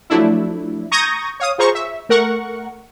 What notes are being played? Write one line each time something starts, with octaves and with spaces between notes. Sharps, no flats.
F3 F#3 A3 D4 E4
A#5 C#6 D#6 G6 G#6 A#6
C#5 F5 D#6
F4 G#4 C5 A#5 C#6
E5
A3 A#4 F#5 C#6